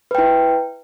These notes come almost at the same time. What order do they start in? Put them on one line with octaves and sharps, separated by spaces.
B4 G5 E4